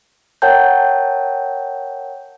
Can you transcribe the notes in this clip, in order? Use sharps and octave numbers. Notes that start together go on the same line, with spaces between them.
A#4 C#5 F#5 G5 A5 G6